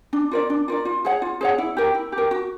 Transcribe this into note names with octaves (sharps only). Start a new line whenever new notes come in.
D4
F4 A#4 D5
D4
F4 A#4 D5
F4
G#4 C#5 F#5
F4
G#4 C#5 F#5
E4
G4 A#4
E4
G4
A#4
F#4